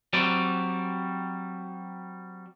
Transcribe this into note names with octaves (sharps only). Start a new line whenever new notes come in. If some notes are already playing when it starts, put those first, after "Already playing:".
F#3 G3 C4 D5